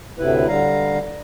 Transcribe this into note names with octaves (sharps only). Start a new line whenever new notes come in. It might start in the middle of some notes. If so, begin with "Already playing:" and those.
D2 A2 C3 E4 B4
D3 G3 F5 A#5